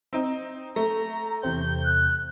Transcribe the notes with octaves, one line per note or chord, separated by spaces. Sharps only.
C4 D#4
A3 A#5 A#6
E2 C3 C4 G6
F#6